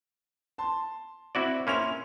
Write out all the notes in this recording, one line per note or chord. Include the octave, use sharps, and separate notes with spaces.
A5 C6
C4 E4 F#4 D5
A#3 C#4 E4 C6 G#6 F7